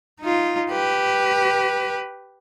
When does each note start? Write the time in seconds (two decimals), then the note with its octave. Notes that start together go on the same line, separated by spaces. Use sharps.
0.21 D#4 F4
0.70 G4 B4